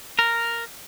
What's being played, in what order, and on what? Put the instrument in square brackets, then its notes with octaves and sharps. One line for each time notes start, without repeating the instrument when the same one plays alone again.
[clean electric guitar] A#4